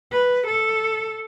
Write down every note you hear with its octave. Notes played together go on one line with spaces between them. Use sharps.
B4
A4